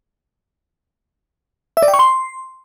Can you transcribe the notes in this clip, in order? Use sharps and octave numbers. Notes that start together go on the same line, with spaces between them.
E5
D5
G5
C#6
C6